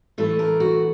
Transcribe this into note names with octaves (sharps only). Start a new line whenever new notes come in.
A2 E3 A3 A4
A#4
F#4